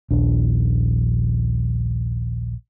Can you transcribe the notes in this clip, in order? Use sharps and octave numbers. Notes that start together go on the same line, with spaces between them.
A#1 D#2 D4